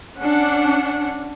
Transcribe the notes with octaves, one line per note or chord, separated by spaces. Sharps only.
C#4 D4 F#5